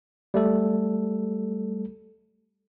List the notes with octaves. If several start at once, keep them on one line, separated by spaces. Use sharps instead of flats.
G3 A3 A4